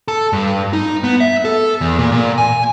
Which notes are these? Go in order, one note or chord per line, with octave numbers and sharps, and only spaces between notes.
A4
G2
D#4
B3
E5
A4
E2
A#2
A#2
G#5